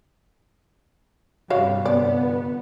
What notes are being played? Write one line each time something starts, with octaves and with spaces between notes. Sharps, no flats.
G2 C3 G3 F#4 C#5 F5
G1 B3 D5